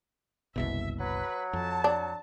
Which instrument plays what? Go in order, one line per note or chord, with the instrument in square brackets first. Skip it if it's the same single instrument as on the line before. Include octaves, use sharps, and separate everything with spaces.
[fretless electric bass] F#1 C2 B2 [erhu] E5
[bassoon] F#3 [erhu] B4
[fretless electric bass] F2 [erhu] A5
[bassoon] F#3 [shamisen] D4